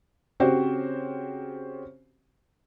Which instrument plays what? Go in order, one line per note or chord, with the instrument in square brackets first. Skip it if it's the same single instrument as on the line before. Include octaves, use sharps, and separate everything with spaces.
[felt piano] C#3 C4 F#4 G4 C5